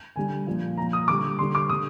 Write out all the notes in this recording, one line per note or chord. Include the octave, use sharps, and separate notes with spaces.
D3 G3 G#5
A#2 F3
A#2 F3 A#5
D#6
D3 G3 D6
D3 G3 C6
D6
D3 G3 D#6